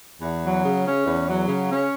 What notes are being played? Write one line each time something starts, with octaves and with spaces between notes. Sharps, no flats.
E2
F#3
C#3
C#4
E2
F#3
C#3
C#4